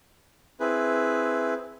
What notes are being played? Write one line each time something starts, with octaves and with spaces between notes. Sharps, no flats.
C4 E4 G#4 B4